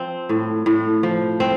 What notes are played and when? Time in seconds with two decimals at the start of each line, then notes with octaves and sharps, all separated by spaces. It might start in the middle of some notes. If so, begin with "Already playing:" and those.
Already playing: F3 C4
0.29 A2
0.66 A2
1.03 F3
1.40 C4